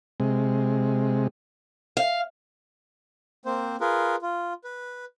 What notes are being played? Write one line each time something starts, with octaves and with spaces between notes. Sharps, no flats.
C3 G#3
F5
A#3 C4 C5
F4 G#4 A#4 B4
F4
B4